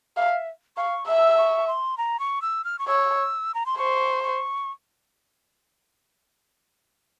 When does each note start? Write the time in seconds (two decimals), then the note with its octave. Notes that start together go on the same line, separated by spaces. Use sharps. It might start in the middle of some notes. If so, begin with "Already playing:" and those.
0.17 E5 F5
0.77 F5 C#6
1.07 E5 E6
1.38 C#6
1.67 C6
1.98 A#5
2.20 C#6
2.42 E6
2.65 F6
2.79 C#6
2.88 C#5 E6
3.55 A#5
3.66 C6
3.78 C5 C#6
4.24 C#6